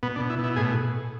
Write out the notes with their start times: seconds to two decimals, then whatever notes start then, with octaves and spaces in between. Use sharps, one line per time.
0.03 B2 B3
0.16 D4
0.20 B2
0.30 E4
0.38 B2
0.44 E4
0.56 A2 G#4